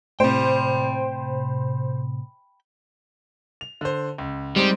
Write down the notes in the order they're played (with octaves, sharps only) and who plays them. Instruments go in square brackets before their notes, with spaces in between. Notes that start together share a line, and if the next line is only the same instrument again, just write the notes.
[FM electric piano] A2 C3 [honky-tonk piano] C5 [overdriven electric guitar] G5 B5
[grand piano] F7
D3 C5
C#2
[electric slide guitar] G3 [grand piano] G#3 C4 D#4